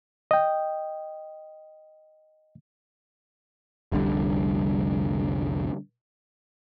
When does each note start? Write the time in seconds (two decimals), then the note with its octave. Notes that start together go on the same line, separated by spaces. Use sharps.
0.31 D#5 G5
3.92 F1 C2 D3 G3